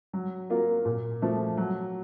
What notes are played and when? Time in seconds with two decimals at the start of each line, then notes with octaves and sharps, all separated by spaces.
0.13 F#3
0.50 A#3 F4 A#4
0.85 A#2
1.22 F3 A3
1.57 F#3